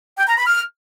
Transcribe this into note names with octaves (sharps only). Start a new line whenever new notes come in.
G5
A#5
B5
F6